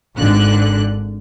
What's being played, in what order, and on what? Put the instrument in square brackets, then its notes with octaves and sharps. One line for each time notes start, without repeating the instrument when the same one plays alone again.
[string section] G#1 D3 F#6